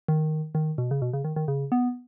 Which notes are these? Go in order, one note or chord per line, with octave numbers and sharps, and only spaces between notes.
D#3
D#3
B2
C#3
B2
C#3
D#3
D#3
C#3
B3